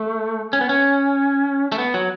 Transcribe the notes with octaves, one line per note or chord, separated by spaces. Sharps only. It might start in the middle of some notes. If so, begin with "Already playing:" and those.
Already playing: A3
C#4
B3
C#4
A3
B3
F#3